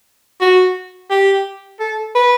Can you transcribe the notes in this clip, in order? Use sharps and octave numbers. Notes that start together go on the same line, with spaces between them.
F#4
G4
A4
B4